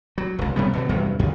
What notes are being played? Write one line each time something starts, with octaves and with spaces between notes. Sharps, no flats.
F#3
F1 C#2
C3 G3 B3
B2 D3 F#3
E2 G2 C3 F#3
F2 D#3